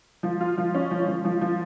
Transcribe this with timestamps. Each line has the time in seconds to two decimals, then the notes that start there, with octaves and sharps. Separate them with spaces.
0.23 F3
0.40 F4
0.58 F3
0.74 C#4
0.91 F3
1.08 F3
1.25 F3
1.41 F3